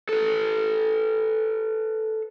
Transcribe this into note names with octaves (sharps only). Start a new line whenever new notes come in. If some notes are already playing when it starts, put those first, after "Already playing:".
A4 B4